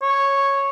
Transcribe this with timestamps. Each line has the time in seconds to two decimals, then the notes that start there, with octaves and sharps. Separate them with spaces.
0.02 C#5